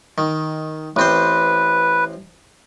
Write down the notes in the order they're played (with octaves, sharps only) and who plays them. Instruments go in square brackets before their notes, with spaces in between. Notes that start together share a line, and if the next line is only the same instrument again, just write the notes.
[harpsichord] D#3
[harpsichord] A1 C4 C5 [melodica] B4